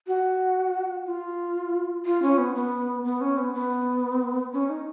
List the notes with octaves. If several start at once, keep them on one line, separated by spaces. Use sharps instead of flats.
F#4
F4
F4
C#4
B3
B3
B3
C#4
B3
B3
C#4
D#4